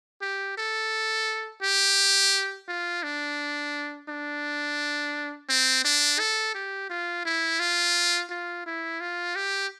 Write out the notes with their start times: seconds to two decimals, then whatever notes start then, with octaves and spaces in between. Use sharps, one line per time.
0.22 G4
0.58 A4
1.62 G4
2.68 F4
3.03 D4
4.09 D4
5.49 C4
5.84 D4
6.19 A4
6.55 G4
6.90 F4
7.25 E4
7.60 F4
8.30 F4
8.66 E4
9.01 F4
9.36 G4